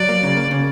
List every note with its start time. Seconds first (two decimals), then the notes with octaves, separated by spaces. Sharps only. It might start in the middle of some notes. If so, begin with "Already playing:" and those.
Already playing: F#3 D5
0.09 A#3
0.23 C#3
0.37 A#3
0.51 C#3